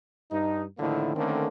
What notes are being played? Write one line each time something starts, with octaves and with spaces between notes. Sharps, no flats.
G2 D#4
A2 D3 D#3 F3 A#3 E4
D3 D#3 A3 A#3 C4 C#4